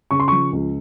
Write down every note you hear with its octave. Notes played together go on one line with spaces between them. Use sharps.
C#3 C#6
C6
F3 C#6
C#2